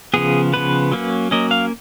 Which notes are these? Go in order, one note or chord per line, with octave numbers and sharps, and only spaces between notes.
C#3 F3 B3 G#4
C#3 F3 B3 B4
F#3 A#3 C#4
F#3 A#3 C#4 D#5
F5